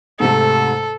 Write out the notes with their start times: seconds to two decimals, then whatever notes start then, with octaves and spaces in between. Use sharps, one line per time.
0.20 G#2 C3 A3 A4